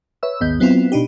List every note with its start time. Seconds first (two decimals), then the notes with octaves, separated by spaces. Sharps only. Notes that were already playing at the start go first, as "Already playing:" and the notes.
0.23 B4 C#5 E5 E6
0.41 G#1 D#2 B3 D#5 G6
0.60 F#3 B3 C4 E4 F4
0.92 B2 D4 D#4 G4